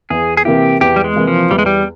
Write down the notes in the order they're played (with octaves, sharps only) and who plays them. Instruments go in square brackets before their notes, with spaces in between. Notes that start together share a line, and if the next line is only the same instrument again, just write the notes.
[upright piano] E2 [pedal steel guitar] G#4
[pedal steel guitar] G#4
[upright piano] C3 E3 A#3 E4 [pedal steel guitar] G4
[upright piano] E2 [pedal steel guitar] G4
[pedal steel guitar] G3
G#3
[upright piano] C3 E3 A#3 E4
[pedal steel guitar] F3
[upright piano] E2 [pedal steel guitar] G3
[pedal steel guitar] G#3
G3